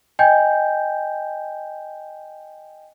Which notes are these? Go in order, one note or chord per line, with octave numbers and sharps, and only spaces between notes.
D#5 G5 G#5 G6